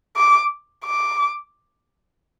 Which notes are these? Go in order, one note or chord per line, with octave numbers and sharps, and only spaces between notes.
D6
D6